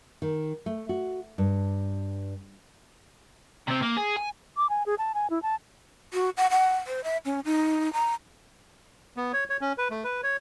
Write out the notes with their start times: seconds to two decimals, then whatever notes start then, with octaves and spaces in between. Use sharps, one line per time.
0.22 D#3
0.66 A3
0.89 F#4
1.38 G2
3.67 C3 C4
3.82 A#3
3.97 G#4
4.16 G#5
4.57 D6
4.69 G#5
4.86 G#4
4.98 A5
5.14 G#5
5.30 E4
5.42 A5
6.13 F#4
6.37 F#5
6.50 F#5
6.87 C5
7.04 E5
7.25 C#4
7.45 D#4
7.93 A#5
9.17 B3
9.33 C#5
9.50 C#5
9.61 C#4
9.78 B4
9.91 A3
10.04 B4
10.23 C#5